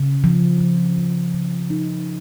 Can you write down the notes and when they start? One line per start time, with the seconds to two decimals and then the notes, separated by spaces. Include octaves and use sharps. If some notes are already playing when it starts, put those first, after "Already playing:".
Already playing: C#3
0.24 F3
0.61 C#3
0.98 C#3
1.34 C#3
1.70 D#4